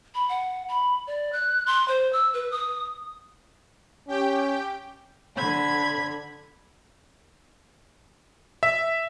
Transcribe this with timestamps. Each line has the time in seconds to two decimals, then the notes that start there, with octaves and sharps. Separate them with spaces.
0.15 B5
0.29 F#5
0.69 B5
1.07 D5
1.33 F#6
1.67 C6
1.88 C5
2.13 E6
2.34 B4
2.51 D#6
4.08 C#4 G4 G5
5.36 D3 B5 G#6
8.63 E5